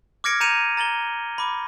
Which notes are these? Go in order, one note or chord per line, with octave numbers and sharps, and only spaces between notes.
D6 F6 G#6 A#6 C#7 D7
A#5 G6 C#7 D#7 F7
A#5 A6 F#7 G7
B5 D6